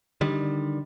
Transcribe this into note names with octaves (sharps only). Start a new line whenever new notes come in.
D3 D#3 G3